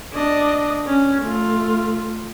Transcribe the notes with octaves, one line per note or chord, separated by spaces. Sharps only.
D4 D#5
C#4
A3 F4